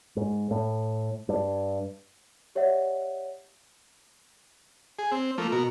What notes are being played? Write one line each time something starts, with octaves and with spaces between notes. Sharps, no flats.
G#2
A2
G2
G4 C#5 D5 E5 F#5
G#4
C4
F3 A3 A#3
B2 F#4 A#4